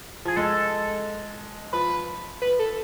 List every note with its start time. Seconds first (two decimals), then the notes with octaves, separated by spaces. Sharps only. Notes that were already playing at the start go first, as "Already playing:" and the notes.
0.25 F3 G#4
0.36 G#3 A4
1.73 F3 B4
2.42 B4
2.59 A4